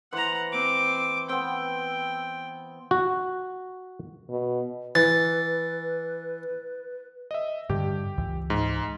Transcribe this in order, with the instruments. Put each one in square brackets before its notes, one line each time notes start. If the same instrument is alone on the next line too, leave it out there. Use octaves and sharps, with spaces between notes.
[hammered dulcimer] E3 C5 [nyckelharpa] F#5 A#5
[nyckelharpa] C4 D6
[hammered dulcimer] B3 C4 [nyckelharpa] G5
[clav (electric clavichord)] F#4
[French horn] B2
[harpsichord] E3 [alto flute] B4 [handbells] A6
[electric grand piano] D#5 E5
[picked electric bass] G2 D3 [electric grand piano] G4
[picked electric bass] C#2 E3
[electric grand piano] G#2